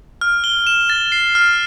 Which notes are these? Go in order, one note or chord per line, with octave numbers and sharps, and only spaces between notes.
F6
G7
E7
A6
C7
F6